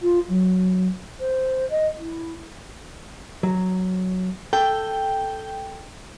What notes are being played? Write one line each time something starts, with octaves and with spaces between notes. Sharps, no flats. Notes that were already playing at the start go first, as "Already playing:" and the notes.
F4
F#3
C5
D#5
E4
F#3
A4 G5